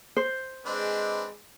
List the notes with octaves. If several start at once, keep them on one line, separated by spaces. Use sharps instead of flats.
C5
G#3 C4 D4 B4